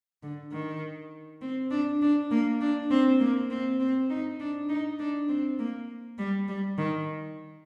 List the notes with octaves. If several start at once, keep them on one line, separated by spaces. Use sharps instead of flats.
D3
D#3
C4
D4
D4
A#3
D4
C4
A#3
C4
C4
D#4
D4
D#4
D4
C4
A#3
G3
G3
D#3